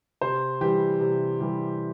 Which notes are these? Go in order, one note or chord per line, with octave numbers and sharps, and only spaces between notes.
C3 C5
E3 G3 G4
C3
E3 G3